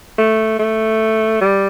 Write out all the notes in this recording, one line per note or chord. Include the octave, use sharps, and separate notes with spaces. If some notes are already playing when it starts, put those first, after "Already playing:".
A3
A3
G3